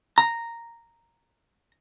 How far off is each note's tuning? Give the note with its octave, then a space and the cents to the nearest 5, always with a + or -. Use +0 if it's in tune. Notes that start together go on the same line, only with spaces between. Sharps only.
A#5 -5